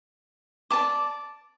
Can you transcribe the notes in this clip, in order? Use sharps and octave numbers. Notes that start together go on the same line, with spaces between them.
D5 A5 D6